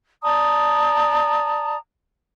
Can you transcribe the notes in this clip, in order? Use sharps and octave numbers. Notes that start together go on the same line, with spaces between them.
D5 A5 A#5 D#6